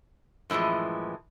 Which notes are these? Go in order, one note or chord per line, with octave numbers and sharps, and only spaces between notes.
F#2 A2 E3 F3 G#3